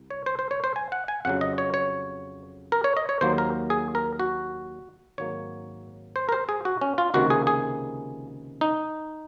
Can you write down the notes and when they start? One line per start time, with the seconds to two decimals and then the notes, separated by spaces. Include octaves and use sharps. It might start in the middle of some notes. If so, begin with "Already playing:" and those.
Already playing: C2
0.10 C#5
0.26 C5
0.39 C5
0.51 C#5
0.64 C5
0.76 G#5
0.92 F#5
1.08 G#5
1.25 F2 C#3 F#3 F#5
1.41 D#5
1.58 C#5
1.74 C#5
2.72 A#4
2.84 C#5
2.97 D#5
3.09 C#5
3.21 D#2 D#3 F#3 A#3 C5
3.38 A#4
3.70 G#4
3.95 A#4
4.20 F#4
5.18 G#1 G#2 F#3 A#3 C#5
6.16 C5
6.29 A#4
6.32 C5
6.49 G#4
6.65 F#4
6.81 C#4
6.98 F4
7.14 C#2 C3 D#3 A#3 F#4
7.30 G#4
7.47 G#4
8.61 D#4